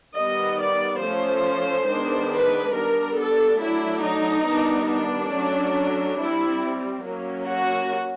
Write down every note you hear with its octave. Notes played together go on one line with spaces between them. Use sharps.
D#3 G3 B3 D#5
D5
F3 A3 C#4 C5
D#3 G#3 B3 D4
B4
G3 B3 D4 A#4
A4
F#3 A3 D4 E4
D#4
D#3 G3 B3 D4
D4
F#3 A3 C#4
G3 C4 E4
F#3 A#3 C#4
F#4